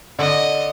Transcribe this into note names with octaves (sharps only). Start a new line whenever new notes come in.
D3 D#5